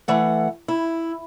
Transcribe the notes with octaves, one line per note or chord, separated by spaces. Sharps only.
E3 A3 F#5
E4